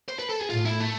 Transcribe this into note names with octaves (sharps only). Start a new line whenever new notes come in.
C5
B4
A4
G#4
A2 F4
E4
A3